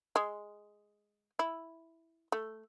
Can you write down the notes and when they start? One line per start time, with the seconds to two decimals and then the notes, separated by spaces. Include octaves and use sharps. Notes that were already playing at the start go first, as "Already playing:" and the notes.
0.16 G#3
1.39 E4
2.32 A3